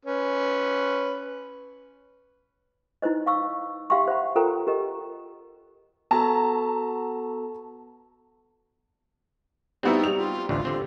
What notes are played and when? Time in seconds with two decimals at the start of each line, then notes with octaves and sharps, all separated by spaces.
0.05 C#4 B4
3.02 D#4 E4 B4 C5 D#5
3.26 F5 C#6 E6
3.90 G4 E5 F5 G5 C6 C#6
4.08 C5 E5 F#5 B5
4.36 F4 A4 A#4 C5 G5 A#5
4.67 G4 A#4 D#5
6.11 B3 F#4 A4 A5 A#5
9.83 G3 B3 C4 D#4 E4 F#4
10.04 G3 F7
10.18 F4
10.49 A1 D2 D3 F4
10.65 D3 C4